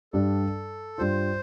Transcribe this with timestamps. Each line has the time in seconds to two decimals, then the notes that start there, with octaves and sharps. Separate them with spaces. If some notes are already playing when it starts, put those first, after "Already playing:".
0.13 G2 G3 D4 A4
0.98 G2 G3 F4 C5